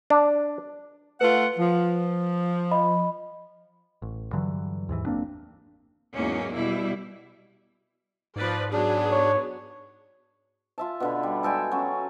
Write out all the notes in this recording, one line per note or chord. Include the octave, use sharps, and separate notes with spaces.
D4
A3 F4 B4 F#5
F3
D#5 B5
A1
G2 D3 E3 F#3
D#2 G#2 E3
F#1 A#3 C4 D4
E2 G#2 F#3 A#3 C#4
B2 G3 E4
G#2 F3 B4 D5
F#3 B3 D4 G#4
C#5
F4 E5 A5
B2 D3 B5
G3
G#3 A4 G5 G#5
F#3 C#4